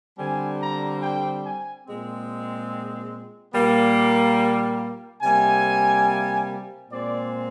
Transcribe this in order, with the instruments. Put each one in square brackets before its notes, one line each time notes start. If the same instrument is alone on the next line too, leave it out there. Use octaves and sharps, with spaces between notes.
[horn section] D3 G3 C4 G#5
A#5
G5
G#5
A#2 G#3 C4
A#2 G3 A#3
C3 G3 A#3 G#5
A#2 G#3 C4 D5